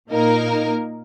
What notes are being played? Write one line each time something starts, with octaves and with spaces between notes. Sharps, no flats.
A#2 A#3 D#4 A#4